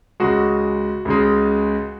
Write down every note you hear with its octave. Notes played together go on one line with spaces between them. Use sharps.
C#2 C#3 G#3 F#4
C#2 C#3 G#3